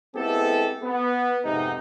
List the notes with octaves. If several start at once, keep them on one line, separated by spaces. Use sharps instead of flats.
G#3 B3 C4 E4 G4 A4
B3
F2 G#2 C3 B3 D#4